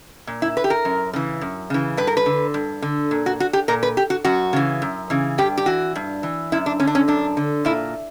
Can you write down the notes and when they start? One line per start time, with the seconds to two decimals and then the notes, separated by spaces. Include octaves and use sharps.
0.27 A#2
0.42 E4
0.57 B4
0.64 G4
0.70 A#4
0.85 F#2
1.13 C#3 E3
1.41 F#2
1.70 C#3 E3
1.97 G2 B4
2.07 A#4
2.17 B4
2.26 D3
2.54 G2
2.82 D3
3.11 A#2
3.26 F#4
3.40 F#4
3.53 G4
3.68 A#2 A#4
3.83 B4
3.97 G4
4.10 F#4
4.25 F#2 F#4
4.53 C#3 E3
4.82 F#2
5.10 C#3 E3
5.38 G2 G4
5.58 G4
5.66 E3 F#4
5.96 G2
6.23 E3
6.52 F#2 E4
6.66 D4
6.80 D3 C#4
6.87 D4
6.95 C#4
7.08 F#2 D4
7.37 D3
7.65 A#2 E4